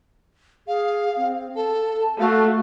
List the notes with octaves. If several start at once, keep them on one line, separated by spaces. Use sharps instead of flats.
G#4 F5
C4
A4 A5
A3 F#4 F5